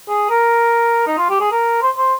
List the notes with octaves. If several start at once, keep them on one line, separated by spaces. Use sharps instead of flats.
G#4
A#4
D#4
F4
G4
G#4
A#4
C5
C5